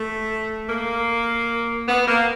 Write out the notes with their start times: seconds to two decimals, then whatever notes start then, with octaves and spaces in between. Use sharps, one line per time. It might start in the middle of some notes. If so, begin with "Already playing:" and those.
Already playing: A3
0.69 A#3
1.88 B3
2.08 A#3